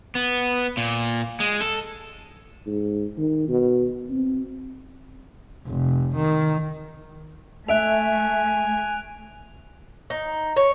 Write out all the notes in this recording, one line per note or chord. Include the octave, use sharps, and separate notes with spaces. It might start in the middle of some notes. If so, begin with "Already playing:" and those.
B3
A#2
G#3
A4
G#2
D#3
B2
C4
F1
D#3
A3 E5 G#5 F#6 D7 F7
D#4
C#5